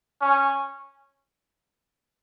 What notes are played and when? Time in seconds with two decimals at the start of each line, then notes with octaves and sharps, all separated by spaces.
0.21 C#4